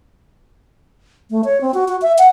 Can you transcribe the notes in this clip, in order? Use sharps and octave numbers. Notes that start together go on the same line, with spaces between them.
A3
C#5
C4
F#4
F#4
E5
F#5